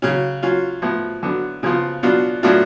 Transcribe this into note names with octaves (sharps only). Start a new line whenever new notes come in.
C#3 F#3 C#4
F#3 C#4 F4
A2 F3 B3
D3 F#3 B3
C#3 F3 B3 F4
B2 F#3 B3 D4 F4
A2 F#3 B3 D4 F4